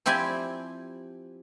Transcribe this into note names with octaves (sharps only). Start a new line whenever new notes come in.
F3 C4 E4 G4 D5 G#5